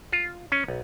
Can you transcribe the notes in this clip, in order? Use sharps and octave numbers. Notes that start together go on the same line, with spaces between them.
F4
C#4
B1